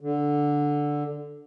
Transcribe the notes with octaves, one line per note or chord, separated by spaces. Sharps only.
D3